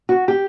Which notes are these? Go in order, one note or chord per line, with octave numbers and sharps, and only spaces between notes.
F#4
G4